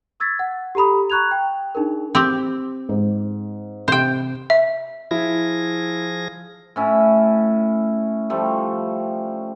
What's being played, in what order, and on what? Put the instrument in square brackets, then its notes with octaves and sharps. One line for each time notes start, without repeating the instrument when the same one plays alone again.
[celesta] C#6 E6 G#6 A6 B6
F#5
G4 A4 A#5 B5 D#6
A#5 C#6 F#6 G#6 F7
G5
D4 D#4 G#4 A#4
[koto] C4 G4
[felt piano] G#2
[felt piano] C3 [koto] C5 G5
[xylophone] E5
[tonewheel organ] F3 G#4 A#6 [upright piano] E4
[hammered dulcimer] A2 C#4 E4
F3 G3 A3